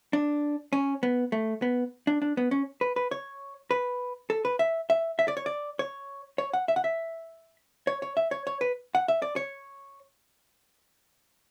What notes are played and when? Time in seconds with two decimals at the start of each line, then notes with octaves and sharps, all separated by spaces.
0.13 D4
0.73 C#4
1.03 B3
1.32 A3
1.62 B3
2.07 D4
2.22 D4
2.37 B3
2.51 C#4
2.81 B4
2.96 B4
3.11 C#5
3.71 B4
4.30 A4
4.45 B4
4.59 E5
4.90 E5
5.19 E5
5.28 D5
5.37 C#5
5.46 D5
5.79 C#5
6.38 C#5
6.53 F#5
6.68 E5
6.76 F#5
6.84 E5
7.87 C#5
8.02 C#5
8.17 E5
8.31 C#5
8.47 C#5
8.61 B4
8.95 F#5
9.08 E5
9.22 D5
9.36 C#5